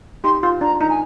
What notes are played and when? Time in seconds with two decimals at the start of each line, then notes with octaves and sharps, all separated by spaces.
0.24 D#4 G4 C6
0.43 F4 C6
0.61 D4 A#5
0.80 D#4 A#5
0.90 G#5